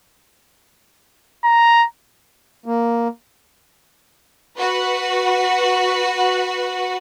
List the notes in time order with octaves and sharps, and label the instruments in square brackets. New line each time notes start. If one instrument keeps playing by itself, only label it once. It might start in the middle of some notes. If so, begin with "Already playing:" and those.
[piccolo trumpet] A#5
[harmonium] A#3
[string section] F#4 B4